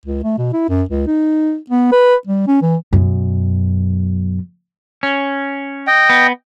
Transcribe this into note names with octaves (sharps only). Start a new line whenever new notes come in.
C#2
A3
B2
E4
F#2
C#2
D#4
B3
B4
G3
C#4
E3
F#2 B2
C#4
D#5 G5
B3